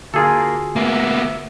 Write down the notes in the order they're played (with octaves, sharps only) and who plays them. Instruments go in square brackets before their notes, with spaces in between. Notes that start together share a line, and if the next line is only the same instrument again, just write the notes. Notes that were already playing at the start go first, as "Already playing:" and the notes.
[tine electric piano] D3 F#4 [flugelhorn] A#3 [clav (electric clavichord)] F4 G#4 A4
[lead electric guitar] A#3 B3 [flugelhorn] E5